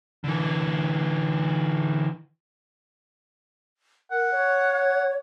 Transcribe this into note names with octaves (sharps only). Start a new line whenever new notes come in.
D3 E3
A#4 F#5
C#5
F#5